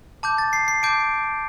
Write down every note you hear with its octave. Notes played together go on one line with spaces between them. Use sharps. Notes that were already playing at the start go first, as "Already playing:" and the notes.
A5 D6 G6
A6
C7
C7
A5 D6 G6 D7